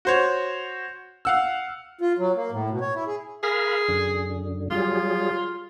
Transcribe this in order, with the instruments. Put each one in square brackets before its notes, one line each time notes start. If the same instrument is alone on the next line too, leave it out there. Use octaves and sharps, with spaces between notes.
[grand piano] F#4 C5 C#5
F5 F#5 E6
[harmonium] F4
F#3
A#3
A2
B2
C#5
E4
G#4
[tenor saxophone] G#4 [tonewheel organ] A#4 F5 B5
[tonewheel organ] F#2 D3
[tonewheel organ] F#3 G3 G#4 [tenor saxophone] F4